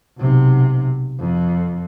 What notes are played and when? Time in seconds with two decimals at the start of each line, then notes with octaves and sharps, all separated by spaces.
0.18 B1 C3
1.19 F2